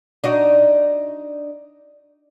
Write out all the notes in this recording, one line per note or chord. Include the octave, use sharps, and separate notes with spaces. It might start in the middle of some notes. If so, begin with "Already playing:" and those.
D4 D#4 F#4